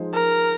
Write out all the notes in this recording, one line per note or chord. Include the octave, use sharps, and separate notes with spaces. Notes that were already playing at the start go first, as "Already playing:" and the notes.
Already playing: F3 G#3 D#4 G#4 C5
A#4